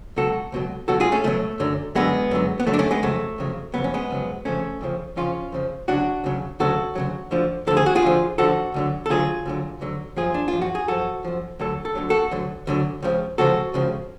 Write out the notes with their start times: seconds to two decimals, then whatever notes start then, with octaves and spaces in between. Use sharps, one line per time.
0.16 C#2 B2 F#3 F#4 A4
0.52 C#2 B2 F#3
0.88 C#2 B2 F#3 F#4 A4
1.00 F4 G#4
1.12 A3 C#4
1.24 C#2 B2 F#3 A3
1.60 F#2 D3 F#3
1.95 F#2 D3 F#3 G#3 B3
2.31 F#2 D3 F#3
2.60 B3
2.67 F#2 D3 F#3 A3
2.74 D4
2.79 A3 C#4
2.91 G#3 B3
3.03 F2 C#3 F#3 A3
3.38 F2 C#3 F#3
3.74 F2 C#3 F#3 B3
3.84 C#4
3.94 G#3 B3
4.10 F2 C#3 F#3
4.45 F2 C#3 F3 A3 C#4
4.81 F2 C#3 F3
5.16 F2 C#3 F3 C#4 F4
5.52 F2 C#3 F3
5.88 D2 C#3 F#3 D4 F#4
6.24 D2 C#3 F#3
6.60 D2 C#3 F#3 F#4 A4
6.95 D2 C#3 F#3
7.31 D2 D3 F3
7.67 D2 D3 F3 A4
7.77 G#4
7.86 F#4
7.96 F4 G#4
8.02 D2 D3 F3
8.38 D2 D3 F3 F#4 A4
8.74 D2 D3 F#3
9.06 A4
9.09 D2 D3 F#3 F4 G#4
9.46 D2 D3 F#3
9.81 D2 D3 F#3
10.17 F#2 F3 F4 G#4
10.34 D4
10.48 F4
10.53 F#2 F3
10.61 F#4
10.75 G#4
10.88 F#2 F3 F#4 A4
11.25 F#2 F3
11.60 D2 D3 F#3 A4
11.85 A4
11.95 D2 D3 F#3
12.10 F#4 A4
12.31 D2 D3 F#3
12.67 D2 D3 F#3
13.03 C#2 C#3 F3
13.38 C#2 C#3 F3 F#4 A4
13.74 C#2 C#3 F3